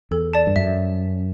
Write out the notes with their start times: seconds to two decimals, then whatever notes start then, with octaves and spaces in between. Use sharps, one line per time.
0.11 E2 A4
0.33 D5 A5
0.47 G2
0.56 F#2 E5